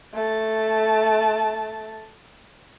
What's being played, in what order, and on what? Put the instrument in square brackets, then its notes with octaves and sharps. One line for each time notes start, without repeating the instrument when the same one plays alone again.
[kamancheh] A3 A5